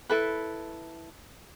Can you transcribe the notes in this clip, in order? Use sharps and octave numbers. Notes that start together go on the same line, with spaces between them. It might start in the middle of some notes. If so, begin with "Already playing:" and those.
E4 A4 B4